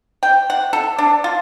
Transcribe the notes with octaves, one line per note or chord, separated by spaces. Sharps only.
G5
F#5
A4
D4
F4